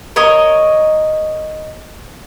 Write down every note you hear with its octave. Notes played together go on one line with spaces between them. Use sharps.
A#4 C#5 D#5